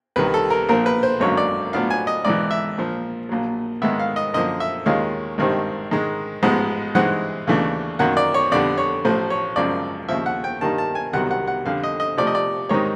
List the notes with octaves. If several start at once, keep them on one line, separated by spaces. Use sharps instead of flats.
C2 C3 D#3 B4
A4
A#4
A#1 A#2 F3 A#4
B4
C5
G#1 F#2 D3 F#3 A#3 C#5
D5
A2 F#3 B3 D4 F4 F5
G#5
D#5
G#1 G#2 E3 D5
E5
A#1 A#2 F3
A#1 A#2 F#3
G#2 D#3 G#3 B3 E5
F5
D#5
F#2 D3 F3 A#3 D#5
E5
D#2 D#3 G#3 C#4 F4 F5
G#1 G2 D#3 G3 C4
G#2 D#3 G#3
A1 G#2 F3 G#3 B3
G2 E3 G#3 C4 D#4 F#5
D#2 C#3 E3 A3 D4
F#2 D#3 F#3 A#3 F#5
D5
C#5
F2 D3 G3 B3 D5
C#5
A1 A2 F3 A3 C5
C#5
G#1 F#2 C#3 F3 D5
D#2 C#3 F3 E5
F#5
G5
G2 D#3 G3 A#3 D#4 A5
A5
G#5
C2 C3 D#3 F#3 B3 F#5
F#5
F#5
F2 D3 G3 F5
D#5
D#5
C3 F3 A3 D5
D#5
D5
G#2 D#3 G3 C4 D#4 C#5